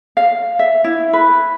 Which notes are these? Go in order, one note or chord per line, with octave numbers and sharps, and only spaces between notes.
F5
E5
E4
B4